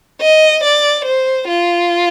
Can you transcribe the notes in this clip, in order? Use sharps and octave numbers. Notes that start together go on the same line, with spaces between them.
D#5
D5
C5
F4